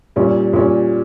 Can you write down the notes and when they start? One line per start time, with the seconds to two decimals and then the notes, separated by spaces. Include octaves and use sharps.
0.16 A#2 G3 C#4
0.53 A#2 G3 C#4